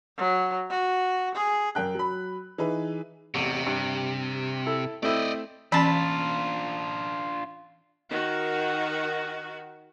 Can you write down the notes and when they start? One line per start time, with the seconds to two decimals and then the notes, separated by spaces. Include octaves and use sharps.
0.17 F#3
0.70 F#4
1.35 G#4
1.75 F#2 A#4 G5 F#6
1.95 F#3 B5
2.58 E3 D#4 G#4 B4
3.34 A1 E2 C3
3.67 G2
4.66 E4 A4
5.03 A3 C4 E4 D5 D#5
5.72 E3 C#4 D4 F4 A5 B5
8.11 D#3 F#4